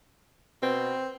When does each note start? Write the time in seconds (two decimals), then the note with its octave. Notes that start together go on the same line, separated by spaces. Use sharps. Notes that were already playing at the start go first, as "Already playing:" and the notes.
0.62 B2 C4